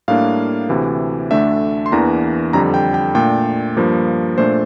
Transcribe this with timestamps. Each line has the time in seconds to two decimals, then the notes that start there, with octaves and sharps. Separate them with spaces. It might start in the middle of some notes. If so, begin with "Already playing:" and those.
0.08 A2 G3 A#3 D4 F5
0.69 D2 C3 E3
1.31 D2 D3 A3 D4 E5
1.86 C6
1.92 E2 E3 A#3 D4 A#5
2.53 F2 D3 G3 A#5
2.74 G5
2.94 G5
3.15 A#2 A3 D4 G5
3.77 G2 F3 A#3
4.38 A#2 A3 D4 C5